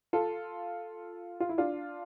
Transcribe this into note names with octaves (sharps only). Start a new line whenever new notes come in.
F4 A4
F4
E4
D4 F4